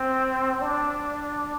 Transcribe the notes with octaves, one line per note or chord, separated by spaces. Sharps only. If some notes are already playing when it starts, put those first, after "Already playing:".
Already playing: C4
D4